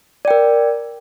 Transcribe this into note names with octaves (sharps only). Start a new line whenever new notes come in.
A#4 D5 G5